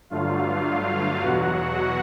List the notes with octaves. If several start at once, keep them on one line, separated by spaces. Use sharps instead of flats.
G2 D3 F#3 A3 F4 F5
E2 B2 F#3 F#4 F#5